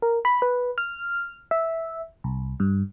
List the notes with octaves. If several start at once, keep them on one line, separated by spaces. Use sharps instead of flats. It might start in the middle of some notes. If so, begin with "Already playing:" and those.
A#4
B5
B4
F6
E5
C2
G2